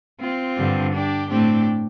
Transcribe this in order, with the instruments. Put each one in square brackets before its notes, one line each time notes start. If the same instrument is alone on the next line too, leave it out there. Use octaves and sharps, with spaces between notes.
[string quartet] C4 F4
G2 D3 G3
D4 G4
A2 A3 C4 D4 G4